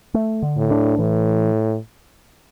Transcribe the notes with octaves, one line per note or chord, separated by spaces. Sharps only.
A3
D3
A2
D4
A2 E3